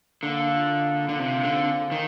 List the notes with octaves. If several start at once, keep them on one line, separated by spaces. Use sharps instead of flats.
D3 A#3
A#4
F4
D#5
A#3
A#4
D3
C3 F3
D#4
D3
C4
G#4
F3
D#3